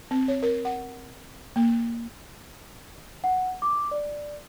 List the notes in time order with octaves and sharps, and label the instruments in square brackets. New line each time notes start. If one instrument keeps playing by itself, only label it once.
[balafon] C4
C#5
A#4
F#5
A#3
[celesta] F#5
D6
D5